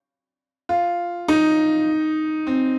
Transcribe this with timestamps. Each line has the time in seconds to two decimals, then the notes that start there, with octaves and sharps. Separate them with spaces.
0.69 F4
1.28 D#4
2.47 C4